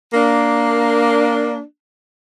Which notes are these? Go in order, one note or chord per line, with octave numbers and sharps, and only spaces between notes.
A#3 D4